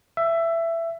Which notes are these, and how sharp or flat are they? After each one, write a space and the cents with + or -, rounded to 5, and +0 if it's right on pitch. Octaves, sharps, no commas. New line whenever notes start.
E5 +15